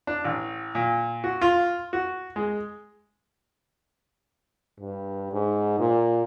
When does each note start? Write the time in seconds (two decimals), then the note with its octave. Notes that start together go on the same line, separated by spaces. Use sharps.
0.07 D4
0.24 A1
0.75 A#2
1.24 F#4
1.41 F4
1.93 F#4
2.36 G#3
4.80 G2
5.32 G#2
5.79 A#2